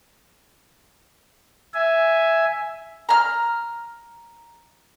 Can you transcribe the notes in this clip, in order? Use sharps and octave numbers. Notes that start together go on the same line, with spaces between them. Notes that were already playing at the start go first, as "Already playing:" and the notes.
E5 G#5
A#5 F6